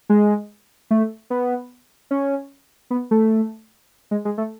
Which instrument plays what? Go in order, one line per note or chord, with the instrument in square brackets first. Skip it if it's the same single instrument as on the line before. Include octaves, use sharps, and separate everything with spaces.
[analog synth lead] G#3
A3
B3
C#4
B3
A3
G#3
G#3
A3